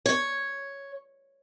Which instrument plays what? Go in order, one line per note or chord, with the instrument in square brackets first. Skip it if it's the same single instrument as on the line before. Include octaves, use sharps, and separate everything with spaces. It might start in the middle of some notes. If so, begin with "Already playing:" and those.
[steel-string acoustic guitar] C#5